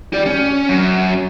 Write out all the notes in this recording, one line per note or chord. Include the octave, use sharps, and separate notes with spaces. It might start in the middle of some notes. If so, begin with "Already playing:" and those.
G4 D5
C#4
F#2